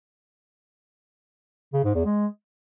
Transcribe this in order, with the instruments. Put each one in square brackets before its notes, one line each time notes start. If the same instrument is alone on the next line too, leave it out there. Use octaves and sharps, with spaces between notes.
[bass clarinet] C#3
G#2
E2
G#3